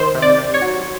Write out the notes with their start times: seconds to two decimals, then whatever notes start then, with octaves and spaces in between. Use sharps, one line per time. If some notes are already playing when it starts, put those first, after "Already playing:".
Already playing: D#3 C5 C6
0.15 C3
0.22 D5 D6
0.38 C3
0.54 C#5 C#6
0.62 F#3